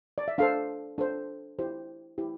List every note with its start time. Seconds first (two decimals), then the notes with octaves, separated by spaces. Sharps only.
0.18 D5
0.28 E5
0.38 D4 A4 C5 F5
0.98 D4 A4 C5
1.59 E4 G4 C5
2.18 E4 G4 C5